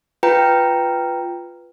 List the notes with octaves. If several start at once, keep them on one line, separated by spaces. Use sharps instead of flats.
F4 B4 G5 A#5